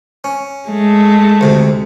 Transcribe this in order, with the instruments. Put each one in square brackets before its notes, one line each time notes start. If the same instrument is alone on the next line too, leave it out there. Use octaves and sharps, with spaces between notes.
[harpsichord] C#4
[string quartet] G#3 A3
[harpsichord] D2 C3